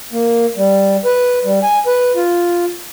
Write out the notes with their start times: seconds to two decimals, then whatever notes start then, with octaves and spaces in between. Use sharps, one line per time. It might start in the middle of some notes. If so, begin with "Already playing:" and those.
0.12 A#3
0.57 G3
1.05 B4
1.44 G3
1.63 G#5
1.86 B4
2.16 F4